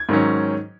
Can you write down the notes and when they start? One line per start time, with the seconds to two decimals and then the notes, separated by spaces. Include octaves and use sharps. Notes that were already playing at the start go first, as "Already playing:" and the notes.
Already playing: G#6
0.09 G#2 D#3 F#3 C#4